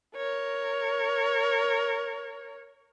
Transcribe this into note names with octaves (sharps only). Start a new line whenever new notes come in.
A#4 C#5